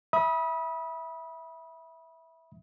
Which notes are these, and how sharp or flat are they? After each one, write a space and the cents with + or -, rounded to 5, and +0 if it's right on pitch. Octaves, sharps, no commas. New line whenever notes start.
E5 -10 B5 -25 D#6 +20